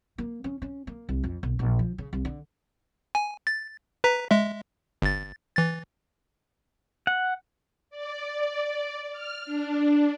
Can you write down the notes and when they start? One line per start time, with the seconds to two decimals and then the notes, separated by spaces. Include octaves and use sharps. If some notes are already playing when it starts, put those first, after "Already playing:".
0.18 A#3
0.44 C#4
0.62 C#4
0.87 A#3
1.09 C2
1.23 F2
1.43 B1
1.59 A#1
1.79 F3
1.98 C#3
2.13 C2
2.25 D3
3.15 G#5
3.47 A6
4.04 B4 A#5 B6
4.31 G#3 E5
5.02 G1 A6
5.56 E3 A6
7.07 F#5
7.90 D5
9.12 F6
9.45 D4